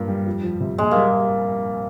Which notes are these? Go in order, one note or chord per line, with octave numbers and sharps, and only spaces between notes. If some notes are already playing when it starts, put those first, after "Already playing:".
Already playing: G2 A#2 A#3
G3
F2
F3
C3
A#1 G#3
G3 A#3